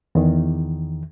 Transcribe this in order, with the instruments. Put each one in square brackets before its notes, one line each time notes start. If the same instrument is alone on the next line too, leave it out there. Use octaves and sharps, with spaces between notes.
[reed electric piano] E2 D#3